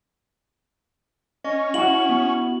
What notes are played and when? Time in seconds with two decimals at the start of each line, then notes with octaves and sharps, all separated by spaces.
1.45 C#4 D#5
1.74 E4 F#4 F#7
2.10 B3